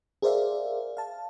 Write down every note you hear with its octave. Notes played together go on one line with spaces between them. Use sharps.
G#4 A#4 C5 D5 E5 F5
F5 A5